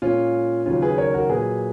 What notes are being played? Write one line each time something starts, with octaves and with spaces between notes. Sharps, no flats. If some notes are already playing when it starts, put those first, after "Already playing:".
A#2 G#3 C#4 F4
D#2 C#3 F#3 C#4 F4
G#4 B4
A#4 C#5
F#4 A#4
A#2 F#3 G#4 B4